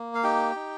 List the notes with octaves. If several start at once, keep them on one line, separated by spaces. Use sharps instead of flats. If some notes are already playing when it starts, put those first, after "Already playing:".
Already playing: A#3
F5
D#4 G4 G5
D#4